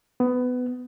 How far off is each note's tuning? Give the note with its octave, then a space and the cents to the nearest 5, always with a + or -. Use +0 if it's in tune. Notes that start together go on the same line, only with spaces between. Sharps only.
B3 +20